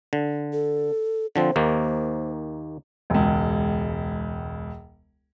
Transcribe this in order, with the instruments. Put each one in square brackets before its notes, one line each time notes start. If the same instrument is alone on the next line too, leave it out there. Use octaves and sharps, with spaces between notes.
[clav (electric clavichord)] D3
[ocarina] A4
[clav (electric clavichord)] D3 F3 C4 [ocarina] C5
[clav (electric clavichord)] D#2 D#3 A#3
[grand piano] E1 C#2